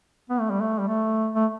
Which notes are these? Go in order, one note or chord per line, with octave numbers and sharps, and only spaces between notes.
B3
A3
G3
A3
G3
A3
A3